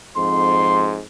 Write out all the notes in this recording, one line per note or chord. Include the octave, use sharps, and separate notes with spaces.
F2 G#2 C6